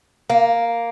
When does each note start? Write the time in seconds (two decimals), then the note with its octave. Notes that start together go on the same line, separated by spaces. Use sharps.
0.30 A#3